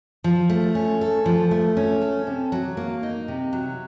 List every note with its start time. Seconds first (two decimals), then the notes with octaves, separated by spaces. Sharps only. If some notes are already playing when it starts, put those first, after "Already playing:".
0.24 F3
0.50 A3
0.75 C#4
1.01 A4
1.26 F3
1.51 A3
1.77 C#4
2.02 A4
2.27 C3
2.52 F#3
2.77 A#3
3.03 D#4
3.28 C3
3.53 F#3